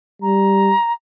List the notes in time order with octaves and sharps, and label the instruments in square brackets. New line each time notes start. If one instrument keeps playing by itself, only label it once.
[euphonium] G3 [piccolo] A#5